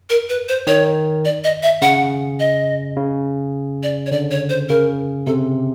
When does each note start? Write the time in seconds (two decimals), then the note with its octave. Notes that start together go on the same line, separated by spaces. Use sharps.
0.10 A#4
0.29 B4
0.49 C5
0.67 D#3 C#5
1.25 D5
1.44 D#5
1.63 E5
1.82 C#3 F#5
2.40 D#5
2.96 C#3
3.83 D5
4.06 C#5
4.11 D3 D5
4.31 C#5
4.49 C5
4.69 C#3 A#4
5.26 C3 A4